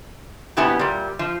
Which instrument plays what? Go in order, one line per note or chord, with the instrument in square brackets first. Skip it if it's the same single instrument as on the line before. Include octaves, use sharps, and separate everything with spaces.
[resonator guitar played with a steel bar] F2 B2 B3 E4 G4 G#5
A#2 G3
F3